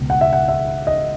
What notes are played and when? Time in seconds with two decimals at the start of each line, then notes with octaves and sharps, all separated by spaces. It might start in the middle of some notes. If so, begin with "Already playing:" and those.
Already playing: C#2 B2
0.10 F#5
0.21 E5
0.33 F#5
0.48 E5
0.87 D#5